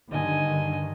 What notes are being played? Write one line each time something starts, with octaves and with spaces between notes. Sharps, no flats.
G2 D3 D#3 D#5 G#5